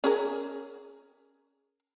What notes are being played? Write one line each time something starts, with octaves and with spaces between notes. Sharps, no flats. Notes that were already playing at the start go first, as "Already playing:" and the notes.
C#4 G#4 A#4